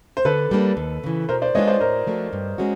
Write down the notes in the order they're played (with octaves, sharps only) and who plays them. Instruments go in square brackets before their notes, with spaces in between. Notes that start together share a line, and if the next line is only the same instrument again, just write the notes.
[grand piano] C5
[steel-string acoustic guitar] D3 [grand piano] A4 B4
[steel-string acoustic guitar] G3 A#3 D4
D#2
C#3 E3
[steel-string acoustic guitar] B2 [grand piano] A#4 C5
[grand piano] C5 D5
[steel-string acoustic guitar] G#3 B3 D4 F4 [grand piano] C#5 D#5
[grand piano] C5 D5
[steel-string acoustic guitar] A2 [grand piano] A#4 C5
[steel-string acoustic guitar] F3 A3 D4 F#4
G2
G#3 C#4 F#4